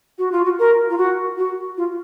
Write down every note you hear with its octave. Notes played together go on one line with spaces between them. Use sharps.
F#4
F4
F#4
A#4
F4
F#4
F#4
F4